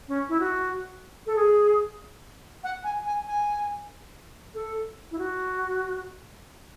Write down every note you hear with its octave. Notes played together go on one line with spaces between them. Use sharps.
C#4
E4
F#4
A4
G#4
F#5
G#5
G#5
G#5
A4
E4
F#4